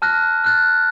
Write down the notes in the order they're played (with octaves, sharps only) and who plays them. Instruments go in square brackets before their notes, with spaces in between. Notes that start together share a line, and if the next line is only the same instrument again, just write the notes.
[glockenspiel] A5 F6 F#6 A#6
F6 F#6 A6